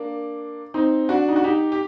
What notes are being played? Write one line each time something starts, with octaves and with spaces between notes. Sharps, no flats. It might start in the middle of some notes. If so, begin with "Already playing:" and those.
Already playing: A#3 D4
C4 D#4
D4 F#4
D#4
F#4
D#4 G4
G4